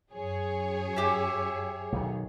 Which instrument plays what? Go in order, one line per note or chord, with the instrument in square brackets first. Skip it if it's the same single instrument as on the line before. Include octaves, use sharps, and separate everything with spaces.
[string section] F#2 G#4 C#5
[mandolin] G4 E5
[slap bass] B1 D#3